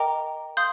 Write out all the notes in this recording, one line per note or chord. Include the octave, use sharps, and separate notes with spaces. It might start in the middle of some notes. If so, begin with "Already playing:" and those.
Already playing: A#4 D#5 G5 A#5 D6
F5 C6 D#6 G6